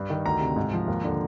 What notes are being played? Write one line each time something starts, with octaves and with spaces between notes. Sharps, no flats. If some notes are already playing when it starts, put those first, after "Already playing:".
Already playing: G2
D#3
D2 A#5
C3
G#2
F3
D#2
D3